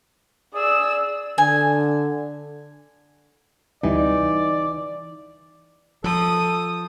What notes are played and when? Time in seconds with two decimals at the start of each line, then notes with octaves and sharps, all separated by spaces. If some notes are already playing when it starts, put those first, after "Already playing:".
0.55 G#4 D5 E6
1.38 D3 G#5
3.83 D2 C3 E3 G3 D#4 D5
6.04 F3 A4 D#6